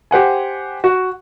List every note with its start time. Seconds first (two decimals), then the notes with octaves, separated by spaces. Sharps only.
0.11 G4 C5 F#5 G#5
0.84 F#4